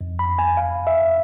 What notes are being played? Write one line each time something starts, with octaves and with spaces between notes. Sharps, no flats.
F2
B5
F2
G#5
E2 F5
E2 E5